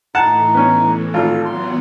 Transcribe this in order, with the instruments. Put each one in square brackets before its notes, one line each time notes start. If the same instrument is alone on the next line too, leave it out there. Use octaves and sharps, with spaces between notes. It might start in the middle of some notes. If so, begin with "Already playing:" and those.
[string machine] A2 E3 [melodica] D#4 [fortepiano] F#5 A5
[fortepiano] B3 C#4
[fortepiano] G#1 F4 [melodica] A4
[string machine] E3 F#3 B3 [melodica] C6